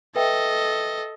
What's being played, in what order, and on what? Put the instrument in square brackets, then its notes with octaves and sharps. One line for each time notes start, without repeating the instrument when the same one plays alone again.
[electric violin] A4 D#5 [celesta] B4 E5 G5